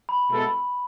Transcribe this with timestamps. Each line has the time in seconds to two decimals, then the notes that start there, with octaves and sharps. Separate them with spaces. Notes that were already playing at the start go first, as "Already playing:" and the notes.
0.09 B5
0.29 B2 G#3 B3 E4 A4